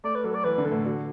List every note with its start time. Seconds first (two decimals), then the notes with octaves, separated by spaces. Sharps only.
0.04 A3 D5
0.15 B4
0.24 F#3 A4
0.35 D5
0.44 E3 B4
0.58 D3
0.65 A4
0.72 A2
0.85 D3 F#4